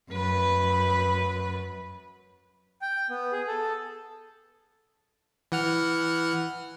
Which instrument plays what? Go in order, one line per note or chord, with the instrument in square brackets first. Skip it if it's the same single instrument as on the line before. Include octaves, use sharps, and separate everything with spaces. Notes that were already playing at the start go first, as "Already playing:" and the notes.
[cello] F#2 B4
[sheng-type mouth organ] G5
B3
G#4
A4
[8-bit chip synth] E3 F#5 F6